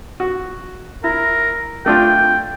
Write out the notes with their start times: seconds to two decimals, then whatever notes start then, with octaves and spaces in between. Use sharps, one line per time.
0.20 F#4
1.04 E4 A#4
1.86 A3 D4 F4 G5